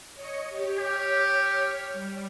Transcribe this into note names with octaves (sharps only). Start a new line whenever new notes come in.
C#5 D#5 C#7
G4 C#5
G4 C#5 F6
G3